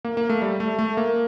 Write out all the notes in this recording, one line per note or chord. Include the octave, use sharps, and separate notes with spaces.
A#3
A#3
A3
G3
A3
A3
A#3